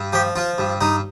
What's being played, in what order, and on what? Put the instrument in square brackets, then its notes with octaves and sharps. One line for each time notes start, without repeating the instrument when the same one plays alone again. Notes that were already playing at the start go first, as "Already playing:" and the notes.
Already playing: [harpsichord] G2
F3 G4
F3 F4
G2
G2 D#4